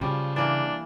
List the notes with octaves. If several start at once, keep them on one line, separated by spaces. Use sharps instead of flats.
C#3 F3 G3
E3 A#3 D4